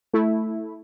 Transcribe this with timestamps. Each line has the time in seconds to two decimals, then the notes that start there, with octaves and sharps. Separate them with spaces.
0.13 A3 E4